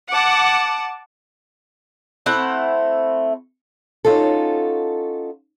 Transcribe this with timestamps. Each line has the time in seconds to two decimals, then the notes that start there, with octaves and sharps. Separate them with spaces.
0.12 F#5 A5 D6
2.26 A3 C4 E4 F#5
4.05 C#4 D#4 F4 F#4 A4